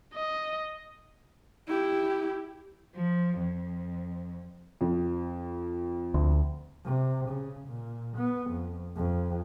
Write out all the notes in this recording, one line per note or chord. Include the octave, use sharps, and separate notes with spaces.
D#5
E4 G4
F3
F2
F2
D2
C3
C#3
A#2
B3
F2
F2